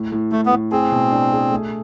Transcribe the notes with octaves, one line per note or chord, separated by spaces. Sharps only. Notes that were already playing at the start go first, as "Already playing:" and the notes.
Already playing: A2
A2
A2 A3
B3
A2
C4 G#4
B2
D4
G#4
A3